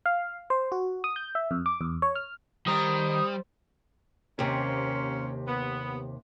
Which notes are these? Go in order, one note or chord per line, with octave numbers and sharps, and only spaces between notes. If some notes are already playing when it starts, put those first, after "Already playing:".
F5
C5
F#4
D#6
G6
E5
F2
D6
E2
C#5
F6
D#3 G3 C4 A#5 D#6
D#2 C3 A#3 C4 C#4
B3